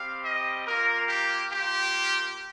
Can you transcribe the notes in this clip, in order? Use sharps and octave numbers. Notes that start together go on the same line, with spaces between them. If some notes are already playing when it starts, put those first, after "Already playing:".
Already playing: G3 C4 G4 F5
D#5
A#3 F4 A#4
G4
A#3 F4 G4